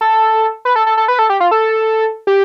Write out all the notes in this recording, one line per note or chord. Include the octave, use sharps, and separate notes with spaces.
A4
B4
A4
A4
A4
B4
A4
G4
F4
A4
G4